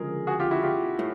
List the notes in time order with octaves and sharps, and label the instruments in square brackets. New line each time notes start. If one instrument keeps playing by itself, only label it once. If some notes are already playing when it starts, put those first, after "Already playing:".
Already playing: [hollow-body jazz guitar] D2 C#3 F3 G#3 [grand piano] G#4 A#4
[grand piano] F#4 G#4
F4 G4
E4 F#4
F4 G4
[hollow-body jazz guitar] A2